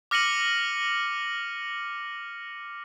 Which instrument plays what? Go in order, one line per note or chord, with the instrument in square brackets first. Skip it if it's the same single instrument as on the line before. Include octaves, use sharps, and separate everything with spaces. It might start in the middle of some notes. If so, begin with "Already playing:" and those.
[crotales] D6 F6 A#6 C#7 D#7 F#7